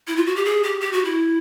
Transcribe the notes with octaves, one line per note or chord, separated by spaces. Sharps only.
E4
F4
F#4
G4
G#4
G4
G4
F#4
E4